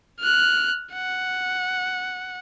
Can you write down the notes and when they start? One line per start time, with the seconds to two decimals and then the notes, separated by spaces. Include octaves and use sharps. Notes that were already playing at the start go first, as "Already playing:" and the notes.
0.20 F6 F#6
0.93 F#5